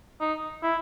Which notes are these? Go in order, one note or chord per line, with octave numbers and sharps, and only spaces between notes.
D#4
E4